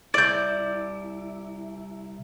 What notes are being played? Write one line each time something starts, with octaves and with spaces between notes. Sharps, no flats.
C2 E4 D5 G6